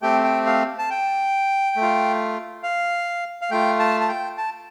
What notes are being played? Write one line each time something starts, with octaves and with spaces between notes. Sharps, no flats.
A3 C4 G4 G5
G5
F5
A5
G5
A3
F4
F5
F5
A3 F4 G5
A5
A5
G5
A5